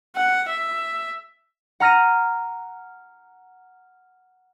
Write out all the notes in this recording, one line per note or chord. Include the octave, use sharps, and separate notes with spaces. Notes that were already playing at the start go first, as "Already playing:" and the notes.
F#5
E5
F#5 A#5 F6 A#6 D#7